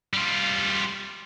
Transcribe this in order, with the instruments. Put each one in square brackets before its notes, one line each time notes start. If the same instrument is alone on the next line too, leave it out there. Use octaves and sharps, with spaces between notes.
[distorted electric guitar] G3 F4